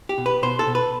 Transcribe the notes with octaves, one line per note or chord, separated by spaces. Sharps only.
G4
B2
B4
B2 C5
A4
B2
B4